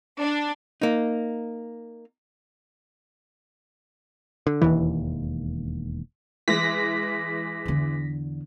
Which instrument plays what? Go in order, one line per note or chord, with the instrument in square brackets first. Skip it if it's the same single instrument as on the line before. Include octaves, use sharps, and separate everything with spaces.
[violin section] D4
[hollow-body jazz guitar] A#3 D#4
[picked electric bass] D3
[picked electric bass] E1 D#2 [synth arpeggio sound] E3
[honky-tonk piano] E3 G#3 [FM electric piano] A#6 B6
[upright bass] E2 D3